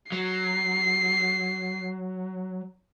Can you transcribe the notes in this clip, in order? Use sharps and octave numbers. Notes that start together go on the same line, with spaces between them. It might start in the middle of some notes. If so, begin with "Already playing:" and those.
F#3 C7